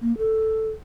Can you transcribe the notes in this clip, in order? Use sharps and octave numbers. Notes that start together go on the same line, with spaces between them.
A#3
A4